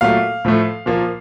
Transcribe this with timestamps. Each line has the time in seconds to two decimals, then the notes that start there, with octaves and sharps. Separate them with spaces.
0.01 A#2 F#3 A3 F5
0.45 A2 F3 A3
0.86 A#2 F3 A#3